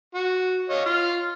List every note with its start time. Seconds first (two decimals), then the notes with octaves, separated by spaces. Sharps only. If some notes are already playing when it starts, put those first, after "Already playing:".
0.15 F#4
0.70 C#5 D#5 F5
0.86 F4 F6